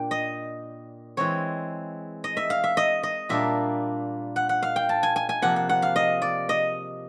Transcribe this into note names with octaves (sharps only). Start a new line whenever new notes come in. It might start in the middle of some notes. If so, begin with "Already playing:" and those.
Already playing: A#2 D4 G5
D#5
E3 G#3 C4 C#5
D#5
E5
F5
E5
D#5
D#5
A#2 G3 A#3 D4 E5
F#5
F#5
F5
G5
A5
G#5
G#5
G#5
C3 F3 A#3 F#5
F#5
F#5
F5
D#5
D5
D#5